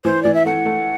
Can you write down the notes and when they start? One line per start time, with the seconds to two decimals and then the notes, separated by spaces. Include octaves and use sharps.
0.04 E3 C5
0.22 E3 D5
0.34 E5
0.45 A3 F#5
0.66 A3